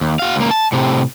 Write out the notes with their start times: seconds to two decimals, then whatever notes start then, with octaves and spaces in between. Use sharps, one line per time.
0.01 D#2
0.19 F#4 F5
0.36 C#2 A#3
0.51 A5
0.72 A2 C3